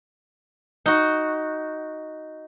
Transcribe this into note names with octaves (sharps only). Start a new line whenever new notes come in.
D#4 F#4